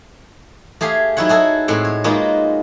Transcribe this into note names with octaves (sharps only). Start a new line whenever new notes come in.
A3 G4 G#4 F5
F#3 D#4 E4 C#5 F#5
F#4 G#4 A4
A2 G#3 C4 F#5
C#5
G#3 A#3 B3 D#4 F4 F#4